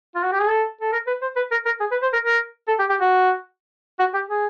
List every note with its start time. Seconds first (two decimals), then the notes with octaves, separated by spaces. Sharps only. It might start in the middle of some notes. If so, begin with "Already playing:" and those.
0.15 F4
0.23 F#4
0.32 G4
0.40 G#4
0.49 A4
0.81 A4
0.92 A#4
1.07 B4
1.22 C5
1.36 B4
1.51 A#4
1.66 A#4
1.80 G#4
1.91 B4
2.02 C5
2.13 A#4
2.24 A#4
2.68 A4
2.79 G4
2.89 G4
3.01 F#4
3.99 F#4
4.14 G4
4.29 G#4